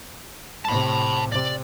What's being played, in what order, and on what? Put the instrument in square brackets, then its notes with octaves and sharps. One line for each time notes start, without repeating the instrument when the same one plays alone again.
[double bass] A2 C3 [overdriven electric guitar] A5 B5
[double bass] C3 [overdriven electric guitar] D5